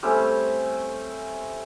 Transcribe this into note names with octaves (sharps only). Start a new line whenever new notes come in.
G3 A3 C4 C#4